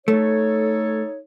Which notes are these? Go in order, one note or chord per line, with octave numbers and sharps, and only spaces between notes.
A3 D#4 A4 C#5